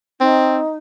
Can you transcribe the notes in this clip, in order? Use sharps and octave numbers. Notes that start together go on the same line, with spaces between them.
C4 D#4